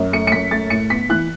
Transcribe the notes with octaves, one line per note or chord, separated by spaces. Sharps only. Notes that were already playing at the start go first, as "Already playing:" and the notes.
Already playing: F#2
A3 C#7
C#7
F#2 B6
A3 A6
A2 C#7
B3 B6
E3 F#6